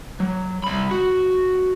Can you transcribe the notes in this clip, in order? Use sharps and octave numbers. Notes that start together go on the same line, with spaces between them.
F#3
C2 B5
F#4